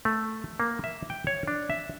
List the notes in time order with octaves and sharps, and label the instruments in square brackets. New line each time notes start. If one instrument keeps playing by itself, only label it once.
[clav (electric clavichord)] A3
A#3
E5
G5
C#5
D4
E5